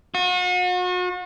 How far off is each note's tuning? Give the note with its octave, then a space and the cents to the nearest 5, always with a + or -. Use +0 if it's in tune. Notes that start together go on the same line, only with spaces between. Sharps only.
F#4 -40